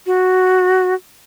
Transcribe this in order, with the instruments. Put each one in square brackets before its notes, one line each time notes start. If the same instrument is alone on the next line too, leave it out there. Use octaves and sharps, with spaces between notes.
[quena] F#4